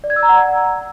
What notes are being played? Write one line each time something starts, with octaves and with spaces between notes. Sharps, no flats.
D5
G#6
E6
A#5
F#5